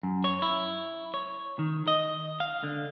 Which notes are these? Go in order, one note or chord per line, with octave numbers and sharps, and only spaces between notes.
F#2
C#5
E4
C#5
D#3
D#5
F5
D3